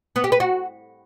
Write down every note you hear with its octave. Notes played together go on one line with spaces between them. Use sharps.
B3
G4
B4
F#4